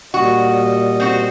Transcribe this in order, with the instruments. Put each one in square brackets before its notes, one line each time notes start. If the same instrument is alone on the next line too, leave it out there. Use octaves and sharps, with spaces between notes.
[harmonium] A#2 G3 D#5 [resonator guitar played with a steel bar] F#4
[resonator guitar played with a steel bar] C4 F#4